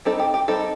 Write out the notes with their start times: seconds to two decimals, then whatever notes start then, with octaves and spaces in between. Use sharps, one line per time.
0.05 G3 C4 D#4 A4
0.19 G4
0.34 G4
0.48 G3 C4 D#4 A4